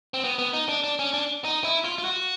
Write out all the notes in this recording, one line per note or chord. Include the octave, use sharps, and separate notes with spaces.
C4
B3
B3
D#4
D4
D4
C#4
D4
D#4
E4
F4
F4
F#4